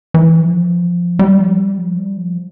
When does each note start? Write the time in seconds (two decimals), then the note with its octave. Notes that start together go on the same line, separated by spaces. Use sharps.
0.14 E3
0.40 F3
1.19 G3
1.38 F3
1.58 G3
1.78 F3
1.98 G3
2.17 F3